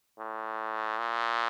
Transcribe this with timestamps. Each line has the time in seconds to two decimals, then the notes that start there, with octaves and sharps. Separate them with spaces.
0.19 A2
0.98 A#2